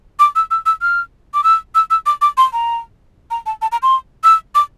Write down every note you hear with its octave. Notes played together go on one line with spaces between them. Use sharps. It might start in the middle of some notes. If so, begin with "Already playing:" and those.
D6
E6
E6
E6
F6
D6
E6
E6
E6
D6
D6
C6
A#5
A#5
A5
A5
A#5
C6
E6
D6